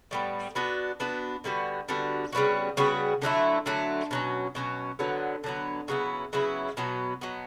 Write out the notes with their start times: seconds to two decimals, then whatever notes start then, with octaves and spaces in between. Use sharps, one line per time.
0.11 A2 G3 B3
0.55 B3 D4 F#4 B4
1.00 B3 D4 F#4 B4
1.44 D3 G3 B3 F#4
1.89 D3 G3 B3 F#4
2.33 C#3 G3 B3 F#4
2.77 C#3 G3 B3 F#4
3.22 D3 F#3 A3 E4
3.66 D3 F#3 A3 E4
4.11 B2 F#3 C#4
4.55 B2 F#3 C#4
4.99 D3 F#3 B3
5.44 D3 F#3 B3
5.88 C#3 F#3 B3 E4
6.33 C#3 F#3 B3 E4
6.77 B2 F#3 B3
7.21 B2 F#3 B3